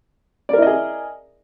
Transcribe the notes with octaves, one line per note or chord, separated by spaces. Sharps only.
E4 G#4 A#4 D5 D#5